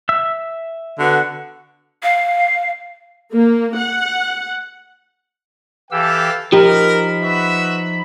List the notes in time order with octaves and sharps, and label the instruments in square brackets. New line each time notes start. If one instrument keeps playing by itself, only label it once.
[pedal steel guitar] E5 E6
[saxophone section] D3 B3 F#4
[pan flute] F5
[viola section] A#3
F#5
[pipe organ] E3 G4 E6 [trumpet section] A4 F5 G5
[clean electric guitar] F3 D#4 [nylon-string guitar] G4 [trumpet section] A#4 [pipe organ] B5
[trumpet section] F#4 B4 E5